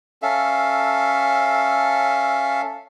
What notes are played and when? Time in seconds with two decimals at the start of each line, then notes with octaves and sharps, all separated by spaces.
0.22 C#4 A4 E5 F5